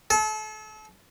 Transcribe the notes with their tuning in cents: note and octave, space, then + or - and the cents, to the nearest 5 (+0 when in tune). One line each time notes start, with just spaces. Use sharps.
A4 -35